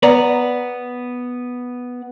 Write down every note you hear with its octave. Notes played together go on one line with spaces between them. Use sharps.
B3 D5 A#5